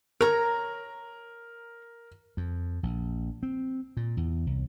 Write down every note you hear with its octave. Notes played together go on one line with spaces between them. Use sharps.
A#4 C#5 A#5
F2
A#1
C4
A#2
E2
C2